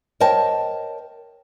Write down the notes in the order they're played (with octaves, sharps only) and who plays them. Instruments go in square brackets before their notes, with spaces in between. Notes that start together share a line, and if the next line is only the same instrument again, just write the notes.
[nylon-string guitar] A#4 C5 C#5 D#5 G5 A5